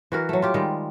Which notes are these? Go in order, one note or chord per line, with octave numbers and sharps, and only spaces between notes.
E3 F#4 A#4
F#3 A3
F4 G4
D#3 G3 G#3